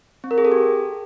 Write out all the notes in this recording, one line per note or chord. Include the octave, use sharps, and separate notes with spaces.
C4
A#4
G#4
A4
G4